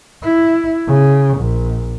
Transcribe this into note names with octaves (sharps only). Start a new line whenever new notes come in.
E4
C#3
A#1